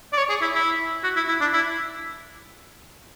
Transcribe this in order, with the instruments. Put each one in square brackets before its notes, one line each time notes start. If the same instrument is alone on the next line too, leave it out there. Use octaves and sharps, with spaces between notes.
[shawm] D5
C#5
G#4
E4
E4
F#4
E4
E4
D4
E4